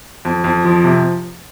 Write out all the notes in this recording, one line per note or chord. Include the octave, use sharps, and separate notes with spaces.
F2
F2
F3
C3